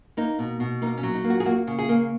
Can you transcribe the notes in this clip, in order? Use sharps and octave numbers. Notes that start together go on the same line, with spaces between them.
A#3 D#4
B2
B2
A#3 D#4
C#4
F#3
D#4
A#3
F#4
G#4
A#3 F#4
C#3
G#4
A#3